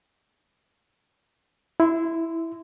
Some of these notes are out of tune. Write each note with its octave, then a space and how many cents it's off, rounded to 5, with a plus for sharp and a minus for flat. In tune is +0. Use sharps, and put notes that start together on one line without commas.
E4 +0 C6 -30